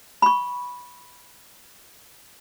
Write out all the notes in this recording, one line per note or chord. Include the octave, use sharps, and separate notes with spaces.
B5 C#6